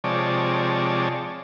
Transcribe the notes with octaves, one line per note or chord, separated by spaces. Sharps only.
C3 F3 G#3 C#5 D5 A5